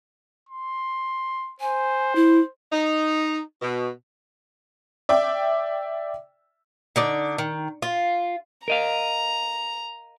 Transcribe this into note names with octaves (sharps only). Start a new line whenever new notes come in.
C6
C5 G#5
E4
D#4
B2
D5 E5 G5 D6
D3 D#4 D5
D#3
F4
A#4 D#5 F5 A#5